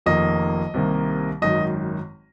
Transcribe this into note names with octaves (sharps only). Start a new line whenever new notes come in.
F1 F2 D#3 A#3 D#5
C2 C3 D#3 A#3
G#1 F#2 D#3 D#5